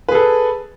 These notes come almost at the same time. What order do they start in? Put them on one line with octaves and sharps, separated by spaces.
B4 G#4 A4